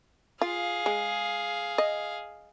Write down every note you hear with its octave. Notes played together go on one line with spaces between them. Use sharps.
F4 G#4 F5
G#3
D#5